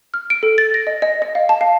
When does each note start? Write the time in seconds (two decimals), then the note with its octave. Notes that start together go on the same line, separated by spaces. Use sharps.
0.14 F6
0.30 D7
0.43 A4
0.58 A6
0.74 A#6
0.87 D#5
1.02 D#5
1.22 D#5
1.35 F5
1.49 A5
1.61 F5